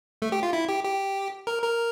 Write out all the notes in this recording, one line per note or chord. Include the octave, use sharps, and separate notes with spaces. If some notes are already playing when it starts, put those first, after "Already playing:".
A3
G4
F4
E4
G4
G4
A#4
A#4